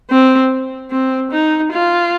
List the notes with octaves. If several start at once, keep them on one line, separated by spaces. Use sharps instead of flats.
C4
C4
D#4
F4